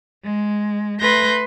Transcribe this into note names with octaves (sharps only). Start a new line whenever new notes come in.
G#3
A3 B4 C6 F#6 G6 A#6